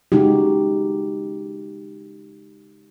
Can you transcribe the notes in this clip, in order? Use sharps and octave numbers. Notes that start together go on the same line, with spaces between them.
C#3 G#3 D#4 F#4 G4